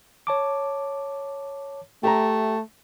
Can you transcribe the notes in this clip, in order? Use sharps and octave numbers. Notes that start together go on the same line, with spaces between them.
C#5 A5 D6
A3 G4 E5 A#5